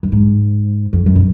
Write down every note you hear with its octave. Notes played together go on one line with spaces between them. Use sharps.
F#2
G#2
F2
F#2
B2